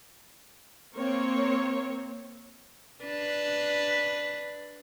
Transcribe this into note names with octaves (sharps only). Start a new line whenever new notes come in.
A#3 C4 C#5
D4 B4